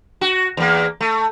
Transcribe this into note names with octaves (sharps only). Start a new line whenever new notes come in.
F#4
E2 A#3
A3